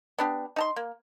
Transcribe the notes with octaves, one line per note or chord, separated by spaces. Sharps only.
B3 D4 G4
D#4 A5 C6
A#3